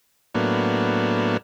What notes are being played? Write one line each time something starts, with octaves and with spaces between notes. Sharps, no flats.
A2 F#3 A#3 B3 D4